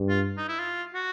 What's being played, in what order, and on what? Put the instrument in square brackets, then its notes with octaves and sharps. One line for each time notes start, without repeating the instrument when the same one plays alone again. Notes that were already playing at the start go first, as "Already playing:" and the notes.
Already playing: [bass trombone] G2
[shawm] F4
D#4
E4
F4
F#4